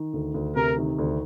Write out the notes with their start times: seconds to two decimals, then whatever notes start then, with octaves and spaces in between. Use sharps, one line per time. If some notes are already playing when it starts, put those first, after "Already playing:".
Already playing: D#3
0.13 D2
0.34 D2
0.55 C3 A#4
0.78 D#3
0.99 D2